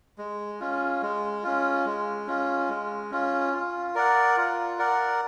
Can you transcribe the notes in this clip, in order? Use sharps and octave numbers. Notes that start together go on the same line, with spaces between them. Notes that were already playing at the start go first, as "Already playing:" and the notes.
G#3
C#4 F4
G#3
C#4 F4
G#3
C#4 F4
G#3
C#4 F4
F4
A#4 D5 F#5
F4
A#4 D5 F#5